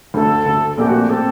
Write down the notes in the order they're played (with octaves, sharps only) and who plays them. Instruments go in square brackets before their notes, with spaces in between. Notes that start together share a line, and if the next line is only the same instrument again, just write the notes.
[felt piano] D2 D3 A3 [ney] A4
[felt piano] D2 D3 A3
[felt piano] A#1 A#2 A3 C4 [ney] G4
[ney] F#4
G4
[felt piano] A#2 A3 C4 [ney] A4